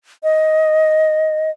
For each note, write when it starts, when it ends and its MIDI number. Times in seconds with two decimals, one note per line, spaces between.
0.23 1.51 75